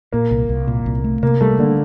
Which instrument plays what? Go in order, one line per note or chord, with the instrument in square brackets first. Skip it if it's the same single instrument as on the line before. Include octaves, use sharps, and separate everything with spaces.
[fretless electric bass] A#2 [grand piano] A#3
[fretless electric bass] C2
C2
A#2
C2
A3
[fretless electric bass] C3 [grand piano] A#3
[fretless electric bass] G3 [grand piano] A3
[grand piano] D3 [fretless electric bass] A#3